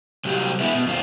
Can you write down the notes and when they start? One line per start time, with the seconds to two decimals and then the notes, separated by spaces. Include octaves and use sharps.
0.25 C3 F#3 G3 G4
0.60 G#3 B3 E4
0.75 B2
0.86 F2 D#3 F4